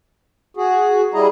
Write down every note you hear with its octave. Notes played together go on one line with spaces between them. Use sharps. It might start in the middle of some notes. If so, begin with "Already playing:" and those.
F#4 G#4
G3 E4 G#4 D#5 A#5